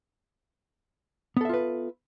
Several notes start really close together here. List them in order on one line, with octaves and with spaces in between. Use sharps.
B3 A4 E5 F4 B4